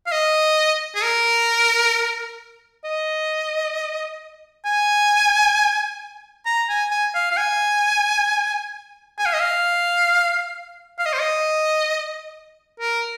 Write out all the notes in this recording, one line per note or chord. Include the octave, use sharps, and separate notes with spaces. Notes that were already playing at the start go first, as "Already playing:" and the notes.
F5
D#5
G#4
A#4
D#5
G#5
A#5
G#5
G#5
F5
F5
G#5
G#5
F5
D#5
F5
F5
D#5
C5
D#5
A#4